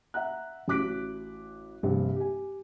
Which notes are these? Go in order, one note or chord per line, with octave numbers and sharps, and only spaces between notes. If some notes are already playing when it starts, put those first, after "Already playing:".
E5 F#5 A#5 F#6
A1 F#4 D6 F#6 B6 D7
A#1 G2 C3
G4 G#5